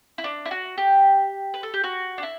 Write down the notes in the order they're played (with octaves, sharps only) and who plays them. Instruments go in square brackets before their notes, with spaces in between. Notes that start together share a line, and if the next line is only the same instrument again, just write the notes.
[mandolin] E4
D4
E4
F#4
G4
B4
A4
G4
F#4
D4
E4